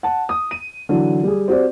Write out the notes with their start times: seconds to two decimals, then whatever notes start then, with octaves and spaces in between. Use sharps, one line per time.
0.03 F#5 A5
0.29 D#6
0.51 D#7
0.89 D3 E3 F#3
1.23 G3 G#4
1.48 C4 F#4 G4 C5 D5